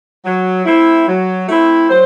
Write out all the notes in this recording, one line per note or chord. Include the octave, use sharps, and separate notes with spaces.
F#3
A3 C4 E4
F#3
A3 C4 E4
F#3 C5